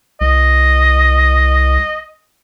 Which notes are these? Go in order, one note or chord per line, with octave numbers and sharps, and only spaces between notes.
C2 D#5